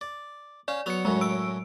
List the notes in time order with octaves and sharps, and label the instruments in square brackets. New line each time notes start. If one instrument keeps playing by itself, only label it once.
[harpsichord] D5
[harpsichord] C#4 F5 [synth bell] D5
[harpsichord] F#3 B3 [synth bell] C#7 F7
[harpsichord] F#2 A2 F#3 [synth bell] G#3
[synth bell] E6 D7